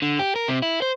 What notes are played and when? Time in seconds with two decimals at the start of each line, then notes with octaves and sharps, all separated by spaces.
0.02 D3
0.19 G4
0.36 A#4
0.48 C3
0.62 E4
0.82 C5